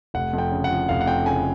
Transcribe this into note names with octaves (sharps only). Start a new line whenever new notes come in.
F1 F#5
F2
G5
C#3
F#5
F3
F1 F5
F#5
F2 G5
C#3 G#5